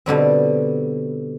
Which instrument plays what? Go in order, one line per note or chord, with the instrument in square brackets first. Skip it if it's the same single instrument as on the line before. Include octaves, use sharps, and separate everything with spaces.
[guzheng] B2 D3 G3 C4